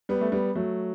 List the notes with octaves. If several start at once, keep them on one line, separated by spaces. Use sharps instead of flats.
G3 B3
A3
G3 B3
F#3 A3